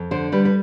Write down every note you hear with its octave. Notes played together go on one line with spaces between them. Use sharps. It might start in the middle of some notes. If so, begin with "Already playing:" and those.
Already playing: F2
D3 C5
G3 B4
B4